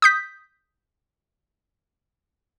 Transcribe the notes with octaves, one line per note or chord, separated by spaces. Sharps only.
D#6 G6 B6